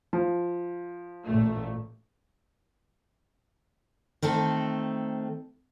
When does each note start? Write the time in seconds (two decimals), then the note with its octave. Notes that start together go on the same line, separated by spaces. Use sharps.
0.13 F3
1.26 A1 A#2 A3
4.22 D#3 A3 C4 A4